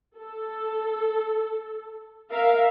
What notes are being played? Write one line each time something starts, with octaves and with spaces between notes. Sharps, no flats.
A4
A#4 E5 F5